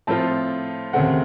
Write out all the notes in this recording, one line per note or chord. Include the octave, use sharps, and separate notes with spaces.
A2 F3 C4 F4 A5
D#2 C#3 A3 C4 F#5